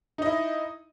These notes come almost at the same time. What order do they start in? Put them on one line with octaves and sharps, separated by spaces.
D#4 D#5 E4